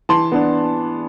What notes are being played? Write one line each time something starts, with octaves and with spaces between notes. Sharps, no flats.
E3 A5 C6
B3 D4